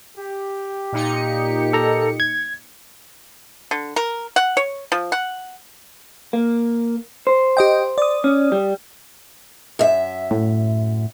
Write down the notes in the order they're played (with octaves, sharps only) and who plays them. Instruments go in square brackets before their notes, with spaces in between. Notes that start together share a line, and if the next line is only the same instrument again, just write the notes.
[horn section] G4
[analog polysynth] A#2 D#4 C#7
[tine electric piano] A4 A#5
G#6
[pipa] D3
A#4
F#5
C#5
F3
F#5
[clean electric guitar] A#3
C5
[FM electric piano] G4 D#5 G5
D5 D#6
[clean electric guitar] C#4
G3
[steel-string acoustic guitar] F#2 E5
[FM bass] A2